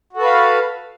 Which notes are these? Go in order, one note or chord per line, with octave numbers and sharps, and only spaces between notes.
F#4 A4 B4 F5